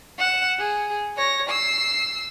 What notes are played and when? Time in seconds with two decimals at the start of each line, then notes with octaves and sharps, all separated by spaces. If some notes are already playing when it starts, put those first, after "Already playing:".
0.18 F#5 E7
0.59 G#4
1.17 C#5 A#6
1.49 E6 C7